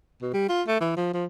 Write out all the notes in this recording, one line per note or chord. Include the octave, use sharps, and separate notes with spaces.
B2
G3
F4
A3
E3
F3
F3